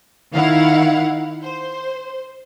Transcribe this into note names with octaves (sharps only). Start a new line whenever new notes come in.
D#3 E4 F5 F#5
C5